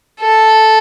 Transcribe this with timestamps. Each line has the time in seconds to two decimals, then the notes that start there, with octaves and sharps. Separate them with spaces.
0.21 A4